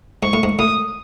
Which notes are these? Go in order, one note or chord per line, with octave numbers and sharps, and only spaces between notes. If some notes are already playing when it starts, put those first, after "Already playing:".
G#2 C#6
A2
G#2
A2 D#6